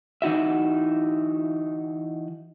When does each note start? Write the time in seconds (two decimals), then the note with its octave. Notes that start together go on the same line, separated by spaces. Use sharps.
0.22 E3 D#4 F#4 E5